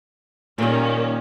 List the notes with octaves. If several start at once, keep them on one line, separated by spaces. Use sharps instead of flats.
A#2 D#3 G3 A#3 C#4